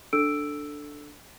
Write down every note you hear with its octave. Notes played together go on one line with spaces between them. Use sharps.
D4 A4 E6 D7